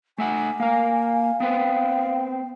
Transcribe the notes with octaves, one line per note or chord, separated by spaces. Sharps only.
A3 E5 F#5 G#5
A#3 A#4 F5
B3 C4 B4 G5